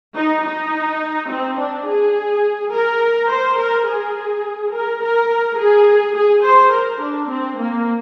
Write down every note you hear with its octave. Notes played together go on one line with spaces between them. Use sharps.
D#4
D#4
C4
D4
G#4
A#4
C5
A#4
G#4
A#4
A#4
G#4
G#4
C5
A#4
D4
C4
A#3